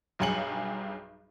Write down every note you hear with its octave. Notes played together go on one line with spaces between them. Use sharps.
B1 G2 F#3 G#4 C#7 F#7